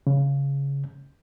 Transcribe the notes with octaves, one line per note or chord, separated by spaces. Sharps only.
C#3